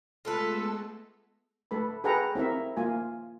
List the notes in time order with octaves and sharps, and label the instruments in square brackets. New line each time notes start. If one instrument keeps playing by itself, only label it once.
[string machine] G#3 A3 B3 [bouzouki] F4 B4 [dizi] A4
[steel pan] A3 A4 B4 B5
G#4 A4 B4 F#5 G5 A#5
C4 E4 A#4 E5
A#3 F4 G#5